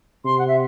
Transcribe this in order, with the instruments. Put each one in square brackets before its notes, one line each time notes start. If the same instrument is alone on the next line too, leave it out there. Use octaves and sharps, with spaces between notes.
[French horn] C3 [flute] C6
[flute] F#5
E5